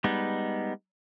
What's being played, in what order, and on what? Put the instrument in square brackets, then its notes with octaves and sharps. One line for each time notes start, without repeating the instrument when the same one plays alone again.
[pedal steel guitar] G3 G#3 B3 D#4